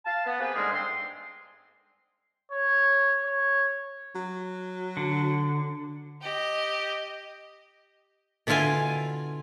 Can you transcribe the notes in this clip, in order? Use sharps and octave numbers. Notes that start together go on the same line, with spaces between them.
F5 A5
B3
A#3 C4 G4 G#4 B4
G#2 D3 G3 G#3 A#3 G#4
G2 C4 C6
C#5
C#5
F#3
D3
G4 D#5
B2 D3 E4 F4 F5 G#5